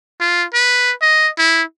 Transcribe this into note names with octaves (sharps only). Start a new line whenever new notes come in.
F4
B4
D#5
E4